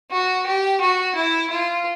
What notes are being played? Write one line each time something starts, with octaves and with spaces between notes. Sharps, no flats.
F#4
G4
F#4
E4
F4